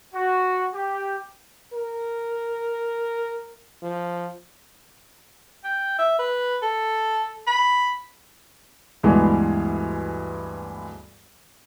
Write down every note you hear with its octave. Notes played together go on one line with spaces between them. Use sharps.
F#4
G4
A#4
F3
G5
E5
B4
A4
B5
D2 G2 E3 G#3 B3